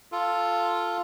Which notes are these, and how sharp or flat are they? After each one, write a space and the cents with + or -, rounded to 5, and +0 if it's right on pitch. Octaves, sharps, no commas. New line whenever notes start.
F4 +0 A4 +0